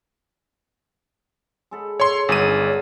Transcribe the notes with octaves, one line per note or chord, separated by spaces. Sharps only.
G#3 A4 B5
A4 C#5 C6
G1 C#3 F#3 G#3 D#7
D4